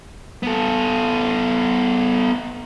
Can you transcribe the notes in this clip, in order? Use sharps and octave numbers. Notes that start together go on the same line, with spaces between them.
B3 A4